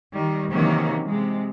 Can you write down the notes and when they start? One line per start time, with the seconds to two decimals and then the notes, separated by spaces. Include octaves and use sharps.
0.12 D#3 G3
0.51 C3 D#3 E3 F#3 A#3 C#4
1.06 C3 G#3